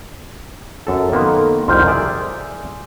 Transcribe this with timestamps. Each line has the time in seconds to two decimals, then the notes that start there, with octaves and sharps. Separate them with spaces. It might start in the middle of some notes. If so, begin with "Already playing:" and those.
0.87 F#2 A4
1.12 D#3 A#3 B3 A4 C6
1.68 C2 F2 D#3 C6 F6 G6
1.87 G#4 D5 E5 G#5